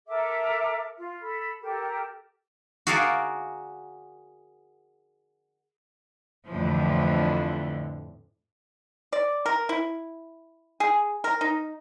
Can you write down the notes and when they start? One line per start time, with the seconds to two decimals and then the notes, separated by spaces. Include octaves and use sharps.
0.07 A4 A#4 E5 D6
0.97 F4
1.20 A4 B5
1.61 G4 A4 A#4
2.87 F#4 G#4 A#4 D5 F5
6.48 F2 A2 D3 E3 F3
9.13 D5
9.46 A#4
9.69 E4
10.80 G#4
11.24 A#4
11.41 D#4